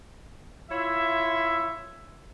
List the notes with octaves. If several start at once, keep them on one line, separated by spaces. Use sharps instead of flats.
E4 F4 C#5 E5